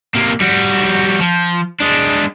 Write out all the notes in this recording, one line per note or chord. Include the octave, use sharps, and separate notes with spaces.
C3 A#3
G3 F#4
F3
G#3 D4